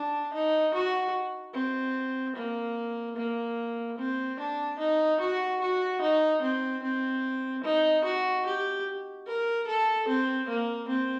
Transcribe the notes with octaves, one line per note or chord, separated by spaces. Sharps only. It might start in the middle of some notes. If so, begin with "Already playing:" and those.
Already playing: D4
D#4
F#4
C4
A#3
A#3
C4
D4
D#4
F#4
F#4
D#4
C4
C4
D#4
F#4
G4
A#4
A4
C4
A#3
C4